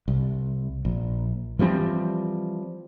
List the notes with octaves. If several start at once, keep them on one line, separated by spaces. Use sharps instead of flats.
C2
A#1
E3 F3 G3 C4